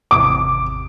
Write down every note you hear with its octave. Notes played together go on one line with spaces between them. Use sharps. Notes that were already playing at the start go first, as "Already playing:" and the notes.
G#1 E2 C3 D6